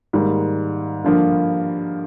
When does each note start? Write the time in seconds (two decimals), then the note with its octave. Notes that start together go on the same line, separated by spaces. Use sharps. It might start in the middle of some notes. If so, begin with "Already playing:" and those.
0.13 G#2 D#3 G3 A#3
1.04 G2 D3 F3 A#3